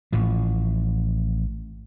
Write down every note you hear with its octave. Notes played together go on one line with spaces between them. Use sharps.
A1 A2 F3